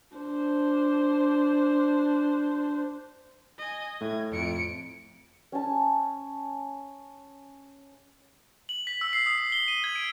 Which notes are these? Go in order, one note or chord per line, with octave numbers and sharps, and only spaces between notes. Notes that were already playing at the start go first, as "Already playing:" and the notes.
D4 C5
D#5 G#5
A2 A3 G#6
F2 C#7 D7
C#4 A5
F#7
B6
E6
C7
D#6
C7
G7
D#7
G#6
D7